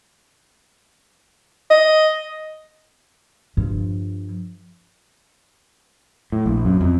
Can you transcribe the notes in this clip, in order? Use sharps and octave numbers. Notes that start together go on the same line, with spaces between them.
D#5
G2 F3
A2
A#1
F#2
F2